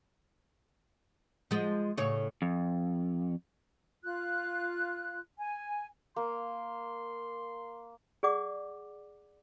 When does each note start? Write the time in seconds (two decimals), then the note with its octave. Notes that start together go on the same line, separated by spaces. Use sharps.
1.51 F3 G#3
1.97 A2 C#3 C#5
2.42 F2
4.04 F4 F#6
5.38 G#5
6.16 A#3 C6
8.23 G#4 D5 F#5 D6